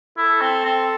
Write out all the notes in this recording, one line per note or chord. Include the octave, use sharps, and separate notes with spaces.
E4 A4
C4
C4